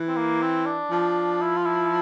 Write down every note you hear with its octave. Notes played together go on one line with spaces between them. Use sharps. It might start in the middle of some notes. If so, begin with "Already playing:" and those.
Already playing: E3
C4
A#3
C4
D4
F3
E4
F4
E4